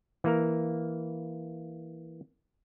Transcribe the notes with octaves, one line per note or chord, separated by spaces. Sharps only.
E3 A#3 A#4